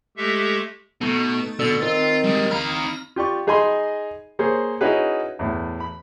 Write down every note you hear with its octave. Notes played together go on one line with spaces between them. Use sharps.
G#3 A3 G4 A4 E5
B2 A3 D#4 A4
B2 D3 E6 A6
D#3 C4 F4
G3 G#3
D#4 F5 A#5 B5 F6
F4 G4 D5 C#6
D#4 G#4 D#5 G#5 B5 C6
A#3 G#4 C5 C#5
C#4 D#4 E4 F#4 G#4 B4
E2 A2
B5